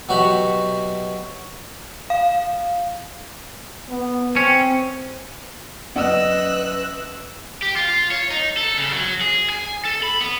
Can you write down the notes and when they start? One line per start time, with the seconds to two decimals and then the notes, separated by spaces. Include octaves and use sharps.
0.09 B2 F#3 F#4 G4 E5 B5
2.10 F5
3.89 B3
4.36 C4 C#4
5.96 F#2 B4 D5 D#5 F#5 E6 F#6
7.62 G4
7.76 F4
8.11 C#5
8.31 D#4
8.57 A4
8.77 C#3
8.92 F#3
9.21 G#4
9.50 G#5
9.85 A4
10.03 B5
10.21 B3